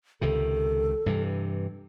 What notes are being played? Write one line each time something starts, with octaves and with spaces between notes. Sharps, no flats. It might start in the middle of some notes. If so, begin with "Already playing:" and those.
C#2 C3 D#3 A4
G2 C3 E3